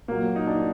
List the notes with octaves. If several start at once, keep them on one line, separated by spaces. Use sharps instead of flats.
A#2 F#3 A#3
D#4
D4